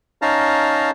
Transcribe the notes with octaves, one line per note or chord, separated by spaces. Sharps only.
C#4 D#4 F5 A5 A#5